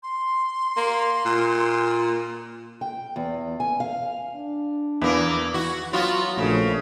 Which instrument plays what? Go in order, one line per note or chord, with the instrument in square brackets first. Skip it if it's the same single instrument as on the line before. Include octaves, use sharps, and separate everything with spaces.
[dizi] C6
[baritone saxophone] A#3
A#2
[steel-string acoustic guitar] G5
E2
G#5
F5
[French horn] D4
[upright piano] E2 B4 [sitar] E3 A#3
[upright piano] E3 [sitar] F#4
[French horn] F#3 [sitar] B3 F4 F#4
[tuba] A#1 [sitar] C#3 [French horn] A3